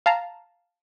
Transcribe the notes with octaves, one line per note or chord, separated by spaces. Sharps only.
F5 A5 A#5